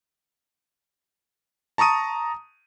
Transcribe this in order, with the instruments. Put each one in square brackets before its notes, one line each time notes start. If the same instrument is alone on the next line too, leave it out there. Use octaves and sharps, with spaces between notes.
[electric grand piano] A5 A#5 C#6 D#6 D#7